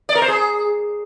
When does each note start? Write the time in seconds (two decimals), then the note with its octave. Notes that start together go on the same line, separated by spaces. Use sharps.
0.09 D5
0.15 A#4
0.22 C5
0.28 G#4